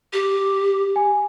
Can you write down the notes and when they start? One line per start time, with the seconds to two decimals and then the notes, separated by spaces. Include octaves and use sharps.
0.13 G4
0.96 G#5